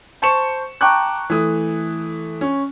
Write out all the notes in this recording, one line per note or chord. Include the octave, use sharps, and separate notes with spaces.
C5 A5 C#6 C#7 E7
G5 A5 A#5 C#6 D6 F#6
E3 A3 D#6
C#4